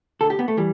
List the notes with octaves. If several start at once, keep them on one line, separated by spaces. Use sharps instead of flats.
D2 D3 A4
G4
B3
A3
E3 G3